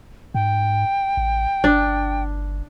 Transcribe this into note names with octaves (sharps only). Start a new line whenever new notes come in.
G#2 G5
A1
G1 D4